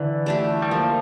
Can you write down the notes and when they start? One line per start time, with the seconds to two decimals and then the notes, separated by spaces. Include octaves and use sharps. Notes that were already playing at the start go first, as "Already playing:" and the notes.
Already playing: D3 E3 E4
0.26 A3 D4 G4
0.62 G3
0.71 F3 A#3